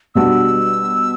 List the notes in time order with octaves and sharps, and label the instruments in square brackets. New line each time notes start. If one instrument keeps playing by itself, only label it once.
[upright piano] B2 G3 D4 F#4 [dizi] E6